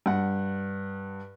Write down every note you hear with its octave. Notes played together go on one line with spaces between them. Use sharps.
G2 F#5